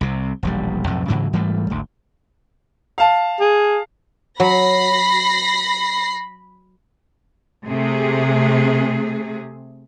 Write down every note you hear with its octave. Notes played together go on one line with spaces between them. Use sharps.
C2 C3
E1 A#1 G3
B1 F2 A2
G#2 C#3 E3 F#3
G#2 E3 G3 A3
G#1 D2
F5 A5
G#4
F#3 B5 A#6 C7
C3 A3 G#4